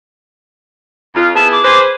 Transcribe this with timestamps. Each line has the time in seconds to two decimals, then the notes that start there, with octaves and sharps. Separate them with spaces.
1.15 F2 F4
1.35 B3 E4 G#4 A5
1.52 D6
1.64 G#4 B4 C5